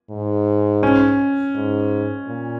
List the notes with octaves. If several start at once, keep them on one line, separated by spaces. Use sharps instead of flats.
G#2
C#4
G#2
A#2